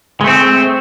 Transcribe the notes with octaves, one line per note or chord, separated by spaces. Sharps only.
G#3 A3 C4